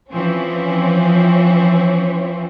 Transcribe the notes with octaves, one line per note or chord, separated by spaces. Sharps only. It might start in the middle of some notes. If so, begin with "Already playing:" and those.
E3 F3 C4 C#4